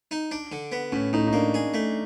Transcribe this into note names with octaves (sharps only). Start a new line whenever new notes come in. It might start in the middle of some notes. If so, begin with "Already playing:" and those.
D#4
D4
D3
B3
A2 C#4
A2 D#4
D#4
A#3 D4
G#4
A3